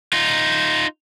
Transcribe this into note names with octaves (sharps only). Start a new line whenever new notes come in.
D#4 F4